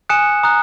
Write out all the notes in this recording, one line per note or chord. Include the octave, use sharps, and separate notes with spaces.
G#5 D#6 F#6 C#7 E7
A#5 D#6 F#6